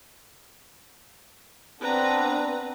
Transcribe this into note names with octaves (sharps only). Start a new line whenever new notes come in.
B3 C4 D4 B4 A#5